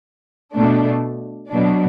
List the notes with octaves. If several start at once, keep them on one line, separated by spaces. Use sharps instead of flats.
B2 A3 D4
B2 F#3 D4